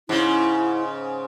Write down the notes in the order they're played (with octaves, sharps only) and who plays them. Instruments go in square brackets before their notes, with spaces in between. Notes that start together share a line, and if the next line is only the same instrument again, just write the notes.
[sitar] G#2 C#3 [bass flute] E4